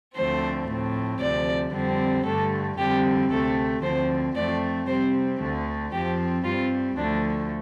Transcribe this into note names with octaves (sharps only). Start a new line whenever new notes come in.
D2 D3 F3 A3 C4 C5
A2 F3 C4
D2 C3 F3 D5
F2 D3 G3 C4
G2 D3 A3 A4
F2 D3 G3 C4 G4
D2 C3 A3 C4 A4
D2 D3 F3 C4 C5
F2 F3 A3 C4 D5
C3 G3 C4 C5
D2 D3 A3
F2 F3 C4 G4
G2 G3 C4 F4
D2 D3 F3 A3 D4